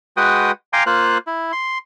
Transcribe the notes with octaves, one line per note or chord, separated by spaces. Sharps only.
G#3 F#4 B4 G5 D#6
F5 G5 G#5 A#5 C6 D6
A#3 F4 C5 F#6
E4
C6